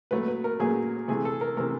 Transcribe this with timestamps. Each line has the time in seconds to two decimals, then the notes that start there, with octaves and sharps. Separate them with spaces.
0.11 A#2 F#3 A3 B4
0.28 B4
0.44 A#4
0.59 A#2 F#3 A3 G#4
1.08 C3 E3 A3 G#4
1.25 A4
1.41 A#4
1.57 C3 E3 A3 A#4